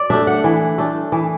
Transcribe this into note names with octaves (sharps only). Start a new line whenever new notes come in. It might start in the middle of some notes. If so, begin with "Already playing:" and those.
Already playing: D5
A3 D4 E5
F#5
E3
A3 D4
E3